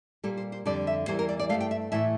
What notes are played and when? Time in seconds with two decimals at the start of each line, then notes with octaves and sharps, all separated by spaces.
0.24 A#2 G3 A#3 A4
0.37 C5
0.52 C5
0.66 F2 D3 G3 D5
0.87 E5
1.08 E2 E3 G3 A#3 C5
1.19 A#4
1.29 D5
1.39 D5
1.49 G2 F3 A3 F5
1.60 G5
1.71 E5
1.92 A2 E3 A3 E5